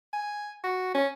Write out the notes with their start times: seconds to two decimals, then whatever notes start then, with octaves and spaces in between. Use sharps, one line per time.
0.13 G#5
0.64 F#4
0.95 C#4